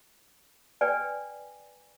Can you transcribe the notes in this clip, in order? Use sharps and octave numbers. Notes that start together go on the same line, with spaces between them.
B4 D5 G5 G#5